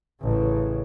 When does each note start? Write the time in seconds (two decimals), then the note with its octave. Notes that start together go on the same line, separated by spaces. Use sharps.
0.22 A1 C#3